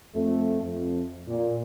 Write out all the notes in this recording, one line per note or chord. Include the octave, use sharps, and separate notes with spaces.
F2 A3
F2
A#2